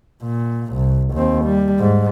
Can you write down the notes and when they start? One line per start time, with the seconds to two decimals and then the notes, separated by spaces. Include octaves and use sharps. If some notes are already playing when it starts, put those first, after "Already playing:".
0.23 A#2
0.74 C2
1.14 D#2 C4
1.45 G3
1.79 G#2